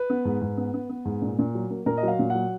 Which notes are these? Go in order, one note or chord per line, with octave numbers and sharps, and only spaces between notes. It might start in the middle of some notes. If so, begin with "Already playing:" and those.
Already playing: B4
B3
G#2
G#2
B3
B3
B3
G#2
A#2
A#2
F#3
A#3
A#2 A#4
D#5
F#3 F5
A#2
F#3 F#5